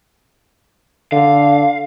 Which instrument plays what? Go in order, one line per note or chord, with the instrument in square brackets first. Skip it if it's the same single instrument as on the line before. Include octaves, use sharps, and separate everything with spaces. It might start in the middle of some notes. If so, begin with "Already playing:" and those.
[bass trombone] D3 [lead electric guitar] F5